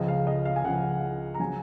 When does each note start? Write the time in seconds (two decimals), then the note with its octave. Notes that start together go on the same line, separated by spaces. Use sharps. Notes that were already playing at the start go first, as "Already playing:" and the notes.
Already playing: C#2 C#3 F3 D#5
0.08 F5
0.27 D#5
0.45 F5
0.56 G#5
0.64 C#2 C#3 F3 F#5
1.34 A#5
1.40 C#3 F#3 G#5